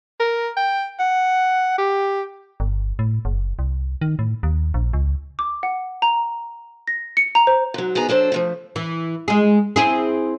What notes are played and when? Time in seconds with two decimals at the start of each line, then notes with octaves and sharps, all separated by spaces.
0.20 A#4
0.57 G5
1.00 F#5
1.78 G4
2.60 G1
2.99 A2
3.25 F#1
3.59 C2
4.01 D#3
4.19 A2
4.43 D#2
4.74 A#1
4.93 C#2
5.39 D6
5.63 F#5
6.02 A#5
6.87 A#6
7.17 C#7
7.35 A#5
7.47 C5
7.74 G#2 F#3
7.95 G#2 B3 D#4 G#4 A#5
8.09 F#3 D4 A4 C5
8.32 F3 G#3 A3
8.76 E3
9.28 G#3 G#4
9.76 C4 E4 G#4